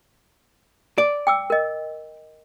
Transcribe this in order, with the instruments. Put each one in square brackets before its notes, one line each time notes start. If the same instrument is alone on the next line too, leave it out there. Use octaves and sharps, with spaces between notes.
[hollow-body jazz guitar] D5
[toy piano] G5 D6 E6
A#4 D#5